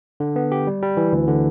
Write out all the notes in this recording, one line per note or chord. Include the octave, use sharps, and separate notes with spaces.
D3
B3
G4
G3
G3
E3
D2
D3